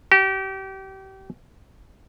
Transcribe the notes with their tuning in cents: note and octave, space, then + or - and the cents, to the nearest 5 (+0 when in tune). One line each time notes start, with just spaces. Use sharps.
G4 -30